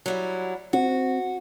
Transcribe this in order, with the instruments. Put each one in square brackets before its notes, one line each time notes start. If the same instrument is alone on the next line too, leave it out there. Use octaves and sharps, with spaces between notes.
[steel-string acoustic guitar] F#3 G3 E4
[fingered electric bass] C4 [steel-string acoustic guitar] F#4